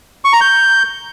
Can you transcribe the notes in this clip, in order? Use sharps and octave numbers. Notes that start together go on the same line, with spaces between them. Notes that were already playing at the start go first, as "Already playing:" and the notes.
C#6
A#5
G6